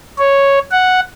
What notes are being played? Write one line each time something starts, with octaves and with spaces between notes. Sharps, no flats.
C#5
F#5